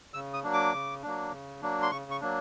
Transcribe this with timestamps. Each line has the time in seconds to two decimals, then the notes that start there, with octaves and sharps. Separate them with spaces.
0.14 C#3 E6
0.34 D#6
0.44 F#3 A#3 D4
0.53 D6
0.73 C#3
1.03 F#3 A#3 D4
1.32 C#3
1.62 F#3 A#3 D4
1.82 C6
1.91 C#3 C#6
2.11 C#6
2.21 F#3 A#3 D4